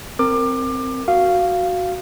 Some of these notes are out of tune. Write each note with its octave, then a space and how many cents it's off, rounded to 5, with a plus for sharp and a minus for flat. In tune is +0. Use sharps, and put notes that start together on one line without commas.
C4 +0 A#4 -15 D6 +25
F#4 +0 F5 -10